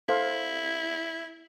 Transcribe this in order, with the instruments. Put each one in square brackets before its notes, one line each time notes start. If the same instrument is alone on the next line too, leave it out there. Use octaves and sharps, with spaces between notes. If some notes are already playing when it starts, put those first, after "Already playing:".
[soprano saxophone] E4 [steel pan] A4 C5 F5